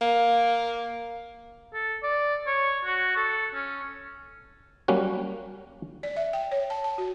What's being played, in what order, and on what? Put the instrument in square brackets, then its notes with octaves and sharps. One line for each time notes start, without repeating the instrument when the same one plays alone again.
[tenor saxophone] A#3
[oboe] A4
D5
C#5
F#4
A4
C#4
[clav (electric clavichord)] F#3 G3 A#3 C#4 F#4
[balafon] D5
E5
G5
C#5
A5
A5
F#4